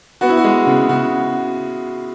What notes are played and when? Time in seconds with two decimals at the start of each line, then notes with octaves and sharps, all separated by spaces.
0.21 B3 F#4
0.29 E4
0.37 F#4
0.44 G#3
0.67 C#3
0.89 C#3 F#4